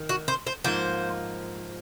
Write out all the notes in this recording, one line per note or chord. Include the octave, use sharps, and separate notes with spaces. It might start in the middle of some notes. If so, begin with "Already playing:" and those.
Already playing: D#3
F#4
C5
C5
G#2 F3 A#3 C5